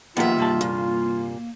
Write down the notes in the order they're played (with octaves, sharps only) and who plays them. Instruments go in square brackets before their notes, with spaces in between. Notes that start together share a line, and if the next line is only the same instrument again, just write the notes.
[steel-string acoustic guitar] D#2 E5 [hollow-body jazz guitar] F3 A#3 B3 [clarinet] F4 [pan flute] F#5
[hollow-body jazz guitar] C2 G2 A5 [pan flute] A#3
[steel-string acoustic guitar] A#2